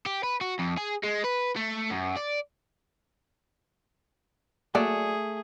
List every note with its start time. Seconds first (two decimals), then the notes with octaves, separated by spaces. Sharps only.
0.06 G4
0.23 B4
0.41 F#4
0.59 F2
0.77 G#4
1.03 G#3
1.24 B4
1.56 A3
1.90 F#2
2.16 D5
4.75 F#3 A3 A#3 G#4 D5